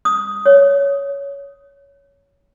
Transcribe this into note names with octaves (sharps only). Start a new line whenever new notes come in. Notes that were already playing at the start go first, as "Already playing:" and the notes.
D#6
C#5